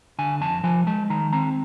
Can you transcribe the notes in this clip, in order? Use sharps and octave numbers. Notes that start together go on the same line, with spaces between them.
D3 G#5
F2 A5
F3 G#5
G#3 A5
D#3 A#5
C4 A#5